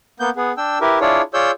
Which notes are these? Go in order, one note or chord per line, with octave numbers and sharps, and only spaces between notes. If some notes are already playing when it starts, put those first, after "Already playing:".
A#3 B3 G6
B3 G#4
D4 G5 E6
E4 G4 A#4 B4
D4 E4 F4 G#4 C#5 D5
F4 G#4 C#5 D5 E6 G6